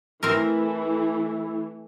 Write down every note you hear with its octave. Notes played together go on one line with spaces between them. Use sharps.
E3 A3 C4 E4 A#4